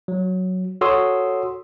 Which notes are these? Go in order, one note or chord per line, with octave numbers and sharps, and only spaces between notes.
F#3
F#4 A4 C#5 C6 D#6 E6